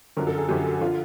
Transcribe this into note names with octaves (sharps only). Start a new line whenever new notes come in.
F#2 D3 F3 A#4
A4
G#4
F#2 D3 F3 G4
F#4
D3 F3 F4